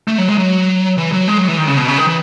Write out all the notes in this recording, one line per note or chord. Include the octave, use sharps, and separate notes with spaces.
A3
F#3
G#3
F#3
E3
F#3
G#3
F#3
E3
D#3
C#3
B2
C#3
D#3
E3